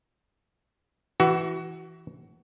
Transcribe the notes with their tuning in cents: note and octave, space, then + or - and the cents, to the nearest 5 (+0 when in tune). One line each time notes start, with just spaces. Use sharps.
E3 +0 F#4 +25